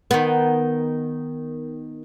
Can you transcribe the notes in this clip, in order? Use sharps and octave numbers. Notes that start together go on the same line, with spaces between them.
D#3 B3